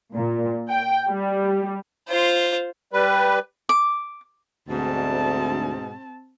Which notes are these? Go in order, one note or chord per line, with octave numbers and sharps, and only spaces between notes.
A#2
G5
G3
F4 C5
G3 B4
D6
D2 G#2 B2 C4 A5